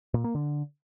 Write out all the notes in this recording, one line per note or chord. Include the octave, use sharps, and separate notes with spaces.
A#2
A#3
D3